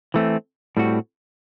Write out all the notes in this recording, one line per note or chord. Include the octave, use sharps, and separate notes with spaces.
E3 A3 C4
A2 G3 C4 F#4